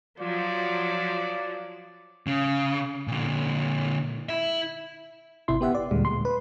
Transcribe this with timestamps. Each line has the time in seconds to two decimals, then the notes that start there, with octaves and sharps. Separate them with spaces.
0.20 F3 F#3 F4 D5
2.27 C#3
3.07 A#2 D3
4.29 E4 E5
5.48 G#1 C3 E4 C6
5.61 B3 G4 E5 F#5
5.75 D5
5.91 D#2 A#2 D3 G3 G#3
6.05 C6
6.25 B4